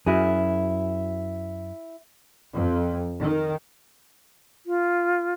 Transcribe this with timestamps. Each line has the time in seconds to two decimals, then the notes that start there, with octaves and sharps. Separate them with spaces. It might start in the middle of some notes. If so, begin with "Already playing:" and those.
0.06 F#2 E4 F#4 G#4
2.55 F2
3.20 D#3
4.66 F4